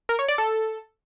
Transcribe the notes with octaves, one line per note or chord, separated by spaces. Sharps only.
A#4
C#5
D5
A4